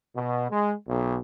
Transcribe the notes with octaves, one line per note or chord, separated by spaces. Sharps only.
B2
G#3
B1